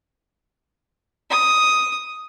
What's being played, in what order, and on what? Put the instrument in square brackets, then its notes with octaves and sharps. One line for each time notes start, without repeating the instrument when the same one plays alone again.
[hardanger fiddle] D#6